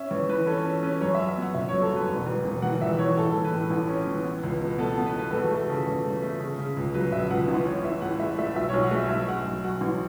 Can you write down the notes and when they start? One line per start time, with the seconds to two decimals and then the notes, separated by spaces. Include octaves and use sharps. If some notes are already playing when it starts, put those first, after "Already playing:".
Already playing: C#4 E5
0.11 E2 C#5
0.29 E3 B4
0.47 C#4 A4
0.65 C#4 A4
0.83 C#4 B4
1.01 F#2 C#5
1.14 F#2 E5
1.29 E5
1.37 B3 F#5
1.54 F#1 E5
1.69 F#3 C#5
1.82 A4
1.91 F#2
1.96 B4
2.10 E1
2.26 E2
2.45 E1
2.62 E3 F#5
2.81 E2 E5
2.99 E3 C#5
3.17 A2 A4
3.30 E3 A4
3.44 B4
3.52 A2
3.58 A4
3.70 A1
3.88 C#4
4.07 E3
4.24 B3
4.43 C#2
4.61 B2
4.78 B3 A4
4.97 B3
5.06 B4
5.14 B2
5.19 B4
5.31 E2 A4
5.42 F#4
5.50 A3 A4
5.69 C#3
5.86 E2 A4
6.05 E2
6.22 A3
6.40 C#3
6.59 C#3
6.77 C#2
6.94 F#3 B4
7.12 C#2 E5
7.31 C#2 F#5
7.48 A1 B4
7.66 C#4 C#5
7.83 A1 E5
8.01 A2 F#5
8.20 A3 E5
8.38 A3 E5
8.56 B1 E5
8.69 B1 C#5
8.83 F#5
8.91 A3 E5
9.09 B1 E5
9.28 A3 F#5
9.45 B1
9.64 F#3 F#5
9.81 A1